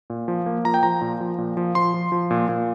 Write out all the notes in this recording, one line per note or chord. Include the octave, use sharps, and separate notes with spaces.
A#2
F3
A#3
F3 A#5
G5
F3 A#5
A#2
F3
A#2
F3
F3 C6
F3
F3
A#2
A#2